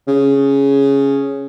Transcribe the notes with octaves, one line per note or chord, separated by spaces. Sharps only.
C#3